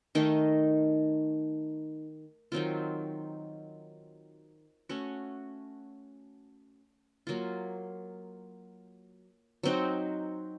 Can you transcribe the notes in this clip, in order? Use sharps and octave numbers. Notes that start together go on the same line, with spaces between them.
D#3 A3 D#4 A#4
D#3 F#3 C4 F4
A3 C#4 F#4
F#3 A#3 F4
F#3 C4 D#4 F#4